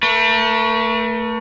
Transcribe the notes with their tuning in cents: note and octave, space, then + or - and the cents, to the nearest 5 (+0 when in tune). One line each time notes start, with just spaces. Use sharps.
A3 +25 B4 -40